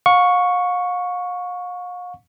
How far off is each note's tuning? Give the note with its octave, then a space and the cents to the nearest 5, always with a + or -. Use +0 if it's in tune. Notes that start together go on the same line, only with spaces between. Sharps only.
F5 +40 C#6 +0